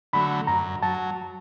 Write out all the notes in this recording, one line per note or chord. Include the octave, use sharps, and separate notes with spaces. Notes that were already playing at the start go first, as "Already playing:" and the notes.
D3 F#3 A3 B5
F#2 A#5
F#3 A5